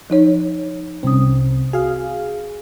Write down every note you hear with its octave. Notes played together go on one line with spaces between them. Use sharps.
F3 D#4 C#5
C2 C4 C#4 D#6
F#4 G#4 F5